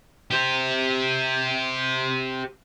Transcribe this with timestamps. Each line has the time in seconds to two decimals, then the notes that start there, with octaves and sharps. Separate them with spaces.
0.31 G4 C5